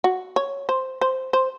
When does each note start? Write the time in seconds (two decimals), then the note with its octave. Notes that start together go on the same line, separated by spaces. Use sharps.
0.04 F#4
0.36 C#5
0.69 C5
1.01 C5
1.33 C5